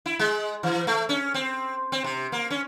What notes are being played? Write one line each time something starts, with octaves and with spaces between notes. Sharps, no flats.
E4
G#3
E3
A3
C#4
C4
C4
C3
A#3
C#4